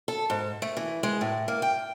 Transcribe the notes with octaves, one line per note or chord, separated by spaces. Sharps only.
A4
G#2
A3
E3
G#3
A2
A#3
G5